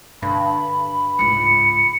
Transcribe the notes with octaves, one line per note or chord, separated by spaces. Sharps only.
G2 D3 B5
C#2 G#2 C#7